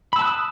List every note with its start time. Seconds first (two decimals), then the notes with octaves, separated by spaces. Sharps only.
0.13 B5
0.16 E6
0.19 A5
0.22 F#6
0.25 D#6